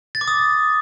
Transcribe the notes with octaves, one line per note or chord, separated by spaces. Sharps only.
A6
D6
D#6